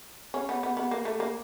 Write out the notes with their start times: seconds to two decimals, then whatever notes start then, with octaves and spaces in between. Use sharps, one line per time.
0.34 C#4
0.49 B3
0.63 B3
0.77 B3
0.91 A#3
1.05 A3
1.20 A#3